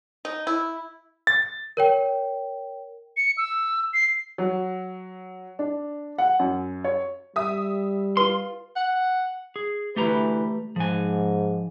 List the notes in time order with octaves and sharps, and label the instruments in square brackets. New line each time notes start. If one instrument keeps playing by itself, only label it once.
[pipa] D#4
E4
[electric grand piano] A6
[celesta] A#4 C#5 G5
[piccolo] C#7
E6
C7
[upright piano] F#3
D4
F#5
F#2
C#5
[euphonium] G3 [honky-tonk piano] E5 D#6
[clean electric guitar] F4 C6 [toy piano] B4
[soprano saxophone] F#5
[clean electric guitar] G#4
[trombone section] D2 E3 B4 [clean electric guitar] A3 G4 A#5
[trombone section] G#2 [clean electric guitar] F3 G#5